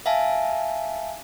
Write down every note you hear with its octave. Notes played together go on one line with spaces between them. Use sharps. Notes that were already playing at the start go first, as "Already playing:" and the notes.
E5 F5 G#5 A5